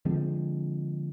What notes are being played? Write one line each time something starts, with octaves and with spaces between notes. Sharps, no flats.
D3 F3 G#3 C4